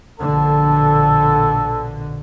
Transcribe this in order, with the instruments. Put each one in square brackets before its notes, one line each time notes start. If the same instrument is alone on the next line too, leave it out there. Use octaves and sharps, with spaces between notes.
[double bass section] A#1 B2 D3 [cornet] A4